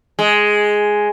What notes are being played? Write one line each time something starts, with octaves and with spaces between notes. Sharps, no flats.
G#3